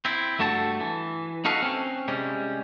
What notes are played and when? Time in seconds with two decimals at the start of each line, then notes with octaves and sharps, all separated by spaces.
0.05 C4 E4
0.39 G2 A3 F#4 A4 A5
0.80 E3
1.45 D#4 F#4 A4 B4 F5
1.62 C4 C#4
2.08 C3 G3 G#3 C#4